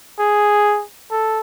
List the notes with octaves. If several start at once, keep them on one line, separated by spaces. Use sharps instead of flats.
G#4
A4